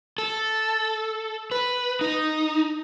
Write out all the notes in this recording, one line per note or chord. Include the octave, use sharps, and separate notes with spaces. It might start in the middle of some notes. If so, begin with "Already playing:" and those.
A4
B4
D#4